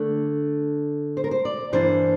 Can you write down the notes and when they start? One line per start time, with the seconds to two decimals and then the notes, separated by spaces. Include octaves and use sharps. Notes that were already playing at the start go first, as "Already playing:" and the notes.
Already playing: D3 A3 D4
1.17 C5
1.24 A#4
1.31 C5
1.45 D5
1.73 G2 E3 A#3 D4 C5